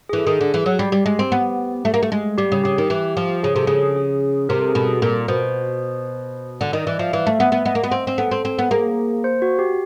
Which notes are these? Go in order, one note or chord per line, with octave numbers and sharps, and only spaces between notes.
G#4
E3
A4
D#3 G#4
D3
E3
F#3
G3 G4
G3
G#3
C4
B3
A3
A#3
A3
G#3
G3 G4
C#3
C#3 G4
D#3
E3
F3
C#3 G#4
C3 A4
C#3 G#4
G#4
C3 A#4
A4
G#4
B2 A4
A#2 A#4
B2 C5
D3 D5
D#3 D#5
E3 D5
E5
F3 F5
E3 E5
A3
B3 E5
B3
B3 D#5
A#3
B3
C4
C4
B3 A4
C4
C4
B3
A#3 G#4
C5
F#4
G4